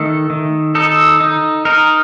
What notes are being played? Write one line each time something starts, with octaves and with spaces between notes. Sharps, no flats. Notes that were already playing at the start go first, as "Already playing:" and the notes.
Already playing: D#3 A3 A4
D#3
D#4 A4
D#4
D#4 A#4